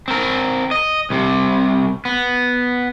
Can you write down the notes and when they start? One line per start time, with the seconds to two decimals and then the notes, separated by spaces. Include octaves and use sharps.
0.08 C4 A#4
0.71 D#5
1.10 C2 C3
2.05 B3